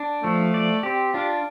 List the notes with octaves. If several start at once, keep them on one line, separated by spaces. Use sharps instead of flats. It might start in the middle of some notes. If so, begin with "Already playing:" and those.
Already playing: D4
F3 A3
D5
C4 G4
D4 F4